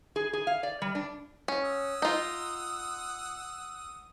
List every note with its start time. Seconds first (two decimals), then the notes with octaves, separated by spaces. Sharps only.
0.16 G#4
0.33 G#4
0.47 F5
0.63 D5
0.82 G3
0.95 D4
1.48 C#4
1.64 F#5 D#6 E6
2.02 D#4 F4